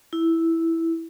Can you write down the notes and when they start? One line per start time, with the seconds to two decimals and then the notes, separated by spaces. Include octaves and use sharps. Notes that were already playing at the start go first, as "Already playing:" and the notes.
0.13 E4